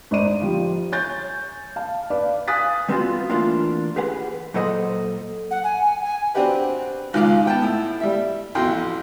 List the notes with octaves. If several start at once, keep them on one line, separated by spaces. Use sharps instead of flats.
G#1 D#4 D5 D#7
F3 G3
C#5 G#5 G6 A6
F5 A5
B4 D5 F5
F5 G#5 D#6 F#6 A6 B6
G3 B3 C4 D4 F4 F#4
E3 A3 A#3 D4 F4
G4 G#4 B4 F#5
A#2 F#3 A4 C5 D#5 F#5
F#5
G#5
G#5
G#5
C4 D4 F#4 G4 B4
G#1 C#2 G#2 F4 F5 D6
B3 G5 A5
A2
G3 E5
A1 F2 B2 G5 C6